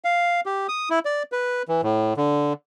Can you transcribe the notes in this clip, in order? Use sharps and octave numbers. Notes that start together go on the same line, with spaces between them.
F5
G4
D#6
E4
D5
B4
E3
A2
D3